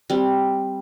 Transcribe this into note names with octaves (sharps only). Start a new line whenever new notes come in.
G3 C4